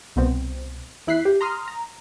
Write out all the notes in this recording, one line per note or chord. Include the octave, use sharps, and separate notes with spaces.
C2 B2 B3 C4
E2 E4 F#6 B6 C7
G4
A#5 C6 D#6 F6
A#5